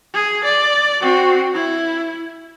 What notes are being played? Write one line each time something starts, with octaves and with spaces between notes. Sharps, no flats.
G#4
D5
C4 F#4
E4